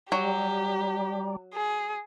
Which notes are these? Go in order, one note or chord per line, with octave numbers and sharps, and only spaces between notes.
F#3 G3 G4 A#5
G#4